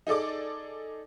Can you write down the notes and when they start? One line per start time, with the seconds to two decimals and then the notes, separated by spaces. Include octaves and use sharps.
0.07 D#4 G#4 A4 D5 D6